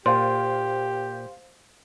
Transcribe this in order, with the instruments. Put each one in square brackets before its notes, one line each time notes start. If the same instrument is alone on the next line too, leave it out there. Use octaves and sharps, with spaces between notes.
[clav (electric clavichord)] A#2 [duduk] G4 [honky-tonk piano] C5 F5 [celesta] C6